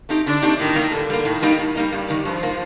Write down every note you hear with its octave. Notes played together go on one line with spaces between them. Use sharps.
A3 C4 D#4 G4
D3 D4
A3 C4 D#4 G4
A2 D#3
G3 A#3
A2 D3
G3 A#3
A2 D#3
G3 A#3 D#4
A2
G3 A#3 D#4
G2 G3
D#3 A#3
G2 F3
D#3 A#3